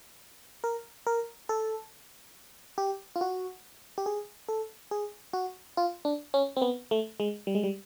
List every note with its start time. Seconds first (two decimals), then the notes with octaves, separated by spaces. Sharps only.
0.64 A#4
1.07 A#4
1.49 A4
2.78 G4
3.16 F4
3.21 F#4
3.98 G4
4.06 G#4
4.49 A4
4.91 G#4
5.33 F#4
5.77 F4
6.05 D4
6.34 C#4
6.56 C4
6.62 B3
6.91 A3
7.20 G#3
7.47 G3
7.55 G#3
7.63 G3